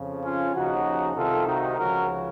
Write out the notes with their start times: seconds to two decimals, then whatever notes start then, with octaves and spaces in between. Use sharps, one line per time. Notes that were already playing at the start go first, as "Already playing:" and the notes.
Already playing: F2 C#3 F3
0.22 C#4 F4
0.54 D#2 C#3 F3 D#4 F#4
1.16 C2 C3 D#3 F4 A4
1.46 D#4 F#4
1.78 C#2 C#3 F3 F#4 A#4